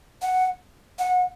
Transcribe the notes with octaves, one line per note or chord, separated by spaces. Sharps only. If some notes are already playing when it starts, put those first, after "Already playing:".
F#5
F#5